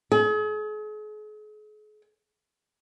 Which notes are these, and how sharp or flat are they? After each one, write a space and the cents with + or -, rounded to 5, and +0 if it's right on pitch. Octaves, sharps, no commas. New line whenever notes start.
G#4 +40